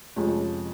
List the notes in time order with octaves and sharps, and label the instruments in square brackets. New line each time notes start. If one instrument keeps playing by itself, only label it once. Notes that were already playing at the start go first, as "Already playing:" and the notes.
[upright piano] F2 C3 F3 G#3 C#4